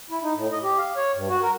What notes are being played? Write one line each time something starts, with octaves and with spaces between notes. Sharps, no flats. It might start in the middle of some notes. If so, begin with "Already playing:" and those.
E4
D#4
A2
D#5
G4
F5
C#5
G2
F#4
A#4